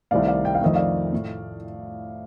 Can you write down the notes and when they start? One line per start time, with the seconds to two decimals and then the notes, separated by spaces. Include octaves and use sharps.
0.11 C2 C3 D#3 A3 D5 F5
0.27 D5 F5
0.45 G5
0.55 F5
0.61 F2 D#3 A3 D#5
0.74 D5 F5
1.13 A2 A3